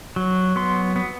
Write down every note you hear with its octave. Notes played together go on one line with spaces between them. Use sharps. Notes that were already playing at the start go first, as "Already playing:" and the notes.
F#3
B3 C6
B3